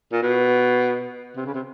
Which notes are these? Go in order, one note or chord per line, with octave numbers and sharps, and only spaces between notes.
A#2
B2
C3
C#3
C3